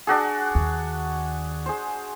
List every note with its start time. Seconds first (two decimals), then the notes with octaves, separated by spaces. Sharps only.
0.07 D4 F#4 G#4
0.55 D#2
1.66 G#4 C5